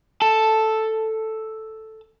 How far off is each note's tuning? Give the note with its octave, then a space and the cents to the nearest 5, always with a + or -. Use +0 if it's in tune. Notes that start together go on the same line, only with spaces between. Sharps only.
A4 +0 A5 +0